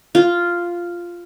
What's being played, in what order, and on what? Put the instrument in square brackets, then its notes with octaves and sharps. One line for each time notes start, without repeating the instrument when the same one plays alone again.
[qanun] F4